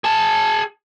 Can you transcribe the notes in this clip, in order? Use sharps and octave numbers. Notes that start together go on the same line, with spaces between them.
G#4 A5